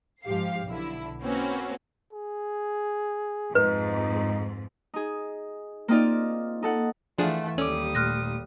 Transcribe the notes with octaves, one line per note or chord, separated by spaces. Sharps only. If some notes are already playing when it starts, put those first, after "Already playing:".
G#2 F3 G4 F5 C7
B1 D3 E4
A#3 C4 C#4 F#4 B4
G#4
F2 G#2 D#4 B4
D#4 G#4
A#3 C4 D#4 F4 D5
D#4 A4 F#5
E3 F3 A3 D4 G#4 F5 F#5 C6
D#2 G3 C#4 A4 D5 D6 D#6
A#2 A3 C6 F6 F#6 A#6